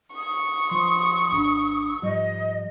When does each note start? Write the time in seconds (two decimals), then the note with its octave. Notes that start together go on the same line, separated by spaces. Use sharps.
0.16 C#6 D#6
0.70 F3 C6
1.32 G#1 D4 B5
2.03 G#2 F3 G3 D#5